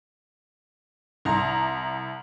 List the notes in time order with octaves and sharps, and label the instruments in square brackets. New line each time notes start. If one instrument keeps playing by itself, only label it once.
[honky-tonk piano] C2 A#5 C6